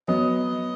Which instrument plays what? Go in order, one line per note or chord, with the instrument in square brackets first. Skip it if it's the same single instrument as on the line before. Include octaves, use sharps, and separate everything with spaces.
[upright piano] F#3 B3 [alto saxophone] D#5